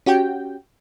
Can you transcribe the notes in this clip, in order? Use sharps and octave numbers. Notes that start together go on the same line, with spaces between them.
C#4 F#4 G4 G5